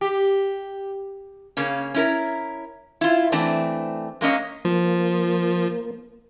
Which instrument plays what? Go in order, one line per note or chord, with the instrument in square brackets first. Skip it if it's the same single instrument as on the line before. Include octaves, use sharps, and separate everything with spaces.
[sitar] G4
[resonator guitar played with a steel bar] C#3 A#3 C#4
C#4 E4 A#4
E4 F4
E3 A3 C4 D4
G#3 A#3 C#4 D#5
[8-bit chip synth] F3 [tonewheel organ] A#3